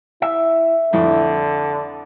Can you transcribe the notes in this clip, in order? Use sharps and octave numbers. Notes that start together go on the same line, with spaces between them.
E4 E5
F2 A2 D3 E3